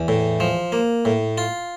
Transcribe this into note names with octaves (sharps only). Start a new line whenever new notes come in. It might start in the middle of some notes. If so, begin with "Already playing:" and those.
Already playing: E2
A2
F3
A#3
A2
F4